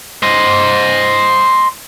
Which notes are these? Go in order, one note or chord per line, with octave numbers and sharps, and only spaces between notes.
C5 D#5